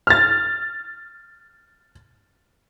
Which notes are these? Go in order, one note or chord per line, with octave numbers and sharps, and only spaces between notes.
F6 A6